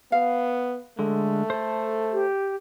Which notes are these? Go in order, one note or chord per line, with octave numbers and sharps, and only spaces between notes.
B3 F5
D3 G#3 A3
A4 C5
G4